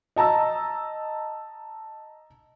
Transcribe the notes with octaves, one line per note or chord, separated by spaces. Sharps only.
D#5 A5 A#5 E6